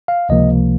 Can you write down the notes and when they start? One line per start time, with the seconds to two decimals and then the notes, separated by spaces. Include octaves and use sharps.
0.08 F5
0.29 C#2 C3 F3 A#3 D#5